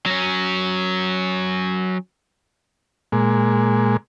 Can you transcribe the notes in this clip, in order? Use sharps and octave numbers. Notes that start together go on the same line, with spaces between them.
F#3 C#4
A#2 G#3